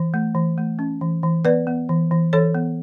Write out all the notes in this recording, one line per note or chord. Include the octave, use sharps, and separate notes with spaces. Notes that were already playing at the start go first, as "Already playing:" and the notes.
Already playing: E3
A3
E3
A3
C#4
E3
E3
B3 B4 D5
B3
E3
E3
E3 A4 C#5
B3